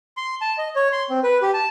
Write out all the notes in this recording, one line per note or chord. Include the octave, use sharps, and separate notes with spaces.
C6
A5
D#5
C#5
C6
C4
B4
G4
A5